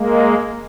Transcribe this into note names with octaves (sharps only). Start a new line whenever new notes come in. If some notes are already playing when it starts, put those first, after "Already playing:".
Already playing: G#3 A#3